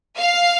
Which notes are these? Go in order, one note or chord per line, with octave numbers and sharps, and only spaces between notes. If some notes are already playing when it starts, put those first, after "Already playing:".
F5